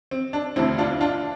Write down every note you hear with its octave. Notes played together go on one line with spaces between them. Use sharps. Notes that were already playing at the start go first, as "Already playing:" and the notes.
C4
D4
E1 D2 D3 C4 E4
D4 F4
D4 F4